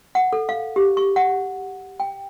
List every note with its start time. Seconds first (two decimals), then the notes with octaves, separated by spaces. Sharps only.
0.15 F#5
0.33 A4
0.49 F5
0.76 G4
0.97 C#6
1.16 F#5
2.00 G5